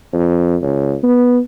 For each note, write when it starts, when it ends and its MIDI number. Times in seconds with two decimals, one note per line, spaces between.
0.13 0.56 41
0.62 0.95 37
1.03 1.38 59